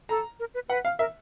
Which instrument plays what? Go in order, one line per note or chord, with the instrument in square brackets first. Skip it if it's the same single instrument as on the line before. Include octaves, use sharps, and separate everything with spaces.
[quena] A4 [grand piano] A#5
[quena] A#4
B4
[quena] B4 [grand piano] F#5
[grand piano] F5
[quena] A#4 [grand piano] E5